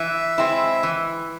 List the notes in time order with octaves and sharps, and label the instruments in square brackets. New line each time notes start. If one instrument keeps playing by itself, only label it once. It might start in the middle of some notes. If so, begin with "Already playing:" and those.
Already playing: [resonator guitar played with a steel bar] E3 [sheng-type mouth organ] E5
[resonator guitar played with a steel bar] G#3 C4 E4
E3